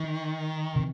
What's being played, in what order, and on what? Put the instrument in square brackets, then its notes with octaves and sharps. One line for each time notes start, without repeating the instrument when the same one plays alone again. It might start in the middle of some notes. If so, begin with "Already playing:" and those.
Already playing: [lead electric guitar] D#3
[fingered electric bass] C3